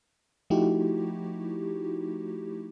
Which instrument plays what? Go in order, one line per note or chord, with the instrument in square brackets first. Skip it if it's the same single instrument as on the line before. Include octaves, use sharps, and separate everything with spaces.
[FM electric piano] F3 A3 D#4 E4 F#4 G4